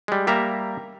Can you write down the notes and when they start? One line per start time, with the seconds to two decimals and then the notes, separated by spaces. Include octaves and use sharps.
0.08 G3 G#3
0.27 G3 A#3 E5 A#5